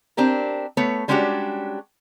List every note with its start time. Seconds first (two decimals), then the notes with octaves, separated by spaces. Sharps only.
0.17 C4 D4 G4 A#4
0.77 A3 B3 C#5
1.08 G3 G#3 C#4 D4 F#4 G4